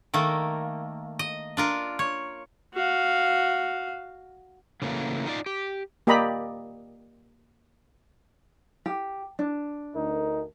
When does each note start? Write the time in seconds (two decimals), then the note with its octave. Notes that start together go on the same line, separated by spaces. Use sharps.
0.14 D#3 A3 A#3
1.19 D#5
1.57 D4 F4 A#4
1.99 C#5
2.74 F#4 F5
4.82 C#3 E3 F#3 A3 A#3
5.26 D#4 F4 D5
5.46 G4
6.07 A#3 G4 D5 D#5 A#5 B5
8.86 G4
9.39 D4
9.95 D2 D#4 A#4